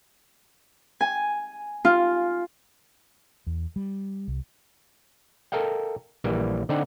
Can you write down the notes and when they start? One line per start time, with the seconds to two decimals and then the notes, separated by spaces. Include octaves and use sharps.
1.01 G#5
1.85 F4
3.47 E2
3.76 G3
4.28 C2
5.52 A4 A#4 D#5 F5 G5
6.24 A#1 E3 G3 A#3
6.69 D3 C4 D#4 D5 F#5 G5